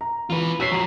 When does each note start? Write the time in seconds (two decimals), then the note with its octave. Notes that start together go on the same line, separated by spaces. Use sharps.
0.01 A#5
0.30 E2 F4 B4
0.60 F#4 C#5 E6 B6 C7
0.72 F3 F#4 A#5